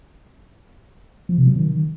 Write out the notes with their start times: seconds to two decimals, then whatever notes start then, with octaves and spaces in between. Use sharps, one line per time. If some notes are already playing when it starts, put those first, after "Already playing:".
1.29 F3
1.38 C3
1.47 F#3
1.56 D#3